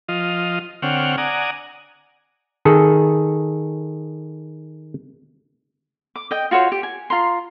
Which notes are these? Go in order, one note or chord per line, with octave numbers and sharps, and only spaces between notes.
F3 F4 D#5
D3 C4 C#5 F#5 G5 F6
D5 F#5 G#5 A#5 D#6
D#3 G#4 A4
D6
D#5 G5
F4 F#4 C5 C#5
G4
G#5
F4 A#5 C6